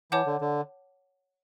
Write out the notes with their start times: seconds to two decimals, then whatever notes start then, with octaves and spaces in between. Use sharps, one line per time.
0.11 E3 C#5 F#5 A5 D6 G6
0.26 D3
0.41 D3